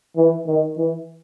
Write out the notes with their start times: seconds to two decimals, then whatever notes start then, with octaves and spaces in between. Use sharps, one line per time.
0.16 E3
0.47 D#3
0.77 E3